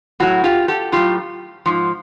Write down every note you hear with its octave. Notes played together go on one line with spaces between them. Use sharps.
A2 F#3 E4 F#4
F4 G4
G4 A4
A2 F#3 F4 G4
G#2 F3